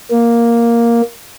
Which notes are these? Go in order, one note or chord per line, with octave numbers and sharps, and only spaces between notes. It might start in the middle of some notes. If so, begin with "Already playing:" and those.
A#3